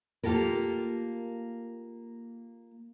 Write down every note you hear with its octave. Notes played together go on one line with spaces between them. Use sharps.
A#3 F4 G4 A4 A#4